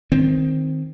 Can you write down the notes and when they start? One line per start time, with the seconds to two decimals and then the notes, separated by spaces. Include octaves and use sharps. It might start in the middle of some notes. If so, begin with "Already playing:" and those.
0.12 D#3 C4